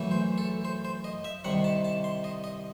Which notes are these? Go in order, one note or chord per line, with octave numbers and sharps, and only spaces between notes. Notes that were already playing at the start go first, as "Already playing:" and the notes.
Already playing: F#2 E3 A3
C5
A4
C5
C5
D#5
E5
C2 C3 D#3 F#5
A5
A5
C6
D#5
D#5